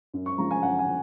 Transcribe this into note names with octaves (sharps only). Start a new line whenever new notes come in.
F#2
C#6
C#3 F3 G#3 A#5
G#5
F#2 F#5
G#5
C#3